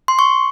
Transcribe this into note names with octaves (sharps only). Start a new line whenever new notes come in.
C6
C#6